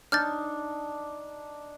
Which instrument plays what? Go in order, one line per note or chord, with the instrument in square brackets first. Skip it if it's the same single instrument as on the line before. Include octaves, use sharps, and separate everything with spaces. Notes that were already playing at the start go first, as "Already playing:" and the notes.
[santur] D4 [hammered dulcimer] D#4 [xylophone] F6 G6 A6